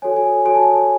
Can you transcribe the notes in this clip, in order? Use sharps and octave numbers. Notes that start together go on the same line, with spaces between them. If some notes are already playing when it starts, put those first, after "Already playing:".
F#4 A4 C#5 G#5
G#5
F#4 A4 C#5 G#5
A5
G#5